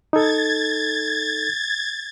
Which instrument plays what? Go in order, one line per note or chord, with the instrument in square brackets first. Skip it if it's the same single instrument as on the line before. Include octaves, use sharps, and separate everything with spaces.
[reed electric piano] D#4 A4 [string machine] G#6 A6